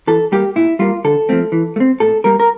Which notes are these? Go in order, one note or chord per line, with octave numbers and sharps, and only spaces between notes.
E3 A4
G3 A#3 G4
A#2 E4
G3 A#3 F4
D3 A4
F3 A3 C4
E3
A3
C4
A2 A4
G3 A#3 A#4
A#4